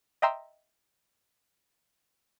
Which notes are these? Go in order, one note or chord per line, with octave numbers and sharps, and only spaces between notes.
D#5 E5 G5 A#5 C6 E6